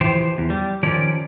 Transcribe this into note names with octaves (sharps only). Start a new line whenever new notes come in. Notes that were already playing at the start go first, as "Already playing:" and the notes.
E3 F3 G4 C5
E2
G3
D#3 F3 C#4 D5